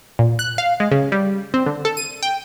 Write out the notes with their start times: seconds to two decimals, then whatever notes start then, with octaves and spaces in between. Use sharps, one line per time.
0.19 A#2
0.39 F#6
0.58 F5
0.80 G#3
0.92 C#3
1.12 G3
1.54 C4
1.66 D3
1.85 A4
1.97 D#7
2.23 G5